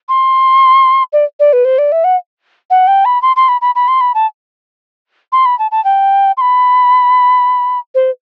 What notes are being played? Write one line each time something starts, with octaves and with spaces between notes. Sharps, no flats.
C6
D5
D5
B4
C5
D5
E5
F#5
F#5
G5
B5
C6
C6
B5
B5
B5
C6
B5
A5
C6
B5
A5
A5
G5
C6
B5
C5